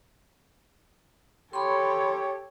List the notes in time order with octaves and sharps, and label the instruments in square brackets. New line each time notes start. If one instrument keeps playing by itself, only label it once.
[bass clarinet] G4 [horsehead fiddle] A4 C#5 [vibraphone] B5 C6